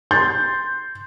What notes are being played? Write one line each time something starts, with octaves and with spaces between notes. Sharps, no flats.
C6 G6 A6